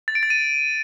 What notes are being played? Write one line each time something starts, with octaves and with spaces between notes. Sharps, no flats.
A6
D7
A6
D#7